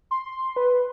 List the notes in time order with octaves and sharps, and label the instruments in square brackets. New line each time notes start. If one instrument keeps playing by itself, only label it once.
[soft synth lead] C6
B4